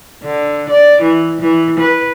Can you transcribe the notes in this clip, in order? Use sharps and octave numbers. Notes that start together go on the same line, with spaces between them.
D3
D5
E3
E3
B4